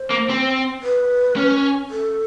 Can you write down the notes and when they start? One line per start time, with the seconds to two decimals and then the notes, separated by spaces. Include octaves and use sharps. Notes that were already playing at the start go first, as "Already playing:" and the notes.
Already playing: C5
0.10 A#3
0.29 C4
0.83 B4
1.36 C#4
1.90 A4